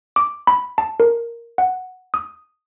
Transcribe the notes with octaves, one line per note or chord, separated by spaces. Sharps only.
D6
B5
A5
A#4
F#5
D#6